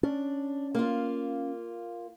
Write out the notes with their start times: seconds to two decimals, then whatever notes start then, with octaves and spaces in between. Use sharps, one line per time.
0.03 C#4 D4
0.75 A#3 F4